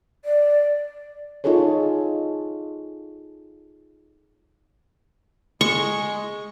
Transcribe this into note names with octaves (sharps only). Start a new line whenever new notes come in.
D5
D#4 F4 G#4 A4 C#5
G#3 C#6